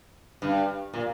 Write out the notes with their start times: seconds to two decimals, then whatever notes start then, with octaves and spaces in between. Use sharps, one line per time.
0.42 G2
0.94 A#2